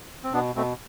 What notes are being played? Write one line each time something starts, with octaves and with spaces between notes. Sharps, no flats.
C4
B2 B3 D4
B2 A3 C4